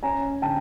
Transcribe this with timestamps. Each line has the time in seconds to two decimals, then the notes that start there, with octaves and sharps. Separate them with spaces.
0.03 C#4 G#5 A#5
0.42 D3 G5 A5